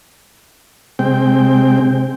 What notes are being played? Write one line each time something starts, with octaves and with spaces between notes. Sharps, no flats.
C3 G#3 C4 G5